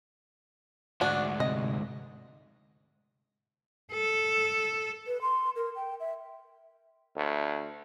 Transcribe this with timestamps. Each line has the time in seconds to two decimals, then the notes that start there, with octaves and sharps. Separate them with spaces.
1.01 D2 G#2 D4 F#4
1.40 C3 D#5
3.93 A4
5.07 B4
5.22 C6
5.56 A#4
5.76 G5
6.00 E5
7.16 D2